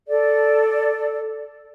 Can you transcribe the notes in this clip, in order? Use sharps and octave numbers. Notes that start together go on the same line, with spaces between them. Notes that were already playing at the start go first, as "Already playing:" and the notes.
A4 D5